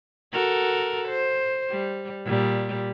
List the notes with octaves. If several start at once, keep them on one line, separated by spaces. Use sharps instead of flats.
F#4 A4 A#4
C5
G3
A#2 G3